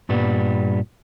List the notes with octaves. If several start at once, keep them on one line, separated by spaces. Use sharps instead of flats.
G2 A#2 G3 B3